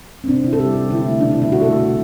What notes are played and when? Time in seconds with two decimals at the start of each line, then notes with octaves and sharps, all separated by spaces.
0.24 C4
0.28 C3 D4
0.44 C3 E4
0.53 A4
0.59 G3 G4
0.75 C3
0.90 D3 E4
1.06 A3
1.21 B2 D4
1.31 E4
1.37 G3
1.42 E4
1.51 C3 F#4
1.62 A4
1.67 A3
1.72 F#4
1.83 C3